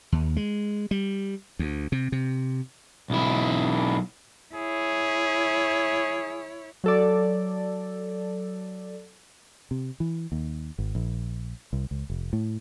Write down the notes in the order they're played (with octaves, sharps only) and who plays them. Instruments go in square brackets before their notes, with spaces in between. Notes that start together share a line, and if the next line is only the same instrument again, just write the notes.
[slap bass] D#2
G#3
G3
D2
C3
C3
[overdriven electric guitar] B1 E4
[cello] E4 C#5 [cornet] G#4
[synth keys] F#3 A4 D5
[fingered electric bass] C3
E3
D#2
G#1
A#1
C2
C#2
F1
A2